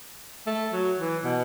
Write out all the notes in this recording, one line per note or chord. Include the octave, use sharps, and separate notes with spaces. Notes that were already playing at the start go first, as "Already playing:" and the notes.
A3
F#3
E3
B2